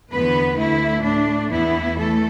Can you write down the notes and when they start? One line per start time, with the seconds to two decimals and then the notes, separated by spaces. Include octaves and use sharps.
0.11 E2 D3 B3 B4
0.58 D2 D3 A3 E4
1.04 A2 A3 D4
1.50 E2 E3 B3 E4
1.96 E2 E3 A3 A4